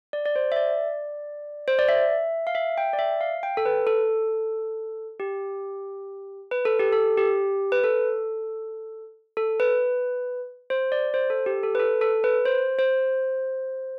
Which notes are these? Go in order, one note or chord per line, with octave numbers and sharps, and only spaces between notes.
D5
D5
C5
E5
D5
C5
D5
E5
F5
E5
G5
D5
E5
F5
G5
A4
B4
A4
G4
B4
A4
G4
A4
G4
B4
A4
A4
B4
C5
D5
C5
A4
G4
A4
B4
A4
A4
B4
C5
C5